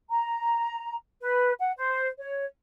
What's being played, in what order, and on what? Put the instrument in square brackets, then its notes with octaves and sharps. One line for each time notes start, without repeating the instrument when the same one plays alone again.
[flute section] A#5
B4
F#5
C5
C#5